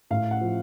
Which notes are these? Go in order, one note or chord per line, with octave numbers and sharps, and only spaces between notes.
A2 F5
F#5
F3